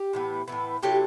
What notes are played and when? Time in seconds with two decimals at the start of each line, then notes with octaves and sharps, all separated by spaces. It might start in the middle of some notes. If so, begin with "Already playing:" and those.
Already playing: G4
0.13 A2 E3 B3
0.48 A2 E3 B3
0.83 C3 F#3 A3 E4 G4